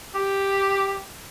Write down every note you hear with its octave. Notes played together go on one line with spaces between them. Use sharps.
G4